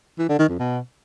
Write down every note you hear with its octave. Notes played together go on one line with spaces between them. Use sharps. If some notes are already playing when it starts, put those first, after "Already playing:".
E3
D3
D#3
F2
B2